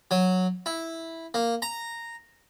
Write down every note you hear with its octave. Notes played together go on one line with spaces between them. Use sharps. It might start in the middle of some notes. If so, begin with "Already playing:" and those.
F#3
E4
A#3
A#5